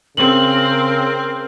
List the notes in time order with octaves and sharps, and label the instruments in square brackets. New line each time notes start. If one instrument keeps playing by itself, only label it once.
[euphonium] C#3 [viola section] C4 [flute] A#4 [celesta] F#7